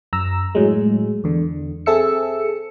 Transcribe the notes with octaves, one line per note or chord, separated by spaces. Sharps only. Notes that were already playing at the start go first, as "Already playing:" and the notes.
F#2 A#5 E6
A2 F#3 G#3
E2 D3
C4 G#4 A4 E5 E6 C#7